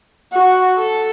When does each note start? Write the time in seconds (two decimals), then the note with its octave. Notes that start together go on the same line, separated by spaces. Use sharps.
0.33 F#4
0.78 A4